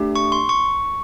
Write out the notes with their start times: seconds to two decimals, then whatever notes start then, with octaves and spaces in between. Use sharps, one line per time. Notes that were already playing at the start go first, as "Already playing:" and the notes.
Already playing: A3 D4 G4
0.15 C#6
0.32 C6
0.49 C#6